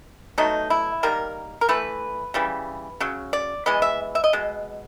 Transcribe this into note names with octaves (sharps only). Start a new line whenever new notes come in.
B2 F#3 A3 D#4
E4
D#3 G3 A#3 A#4
A#4
E3 A3 B4
C#3 E3 G3
C#3 F#3
D5
E3 G#3 B3 D#5
E5
E5
D#5
B2 G#3